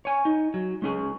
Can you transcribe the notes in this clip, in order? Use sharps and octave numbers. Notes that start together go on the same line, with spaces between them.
C#5 G#5
D#4
F#3
G#3 C#4 G#4